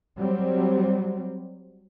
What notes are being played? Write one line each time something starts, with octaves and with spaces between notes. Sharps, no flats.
F#3 G3 C4